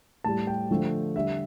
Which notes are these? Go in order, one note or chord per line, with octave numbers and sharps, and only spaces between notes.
A2 G3 A5
G5
D3 F3 A3
D3 G3 E5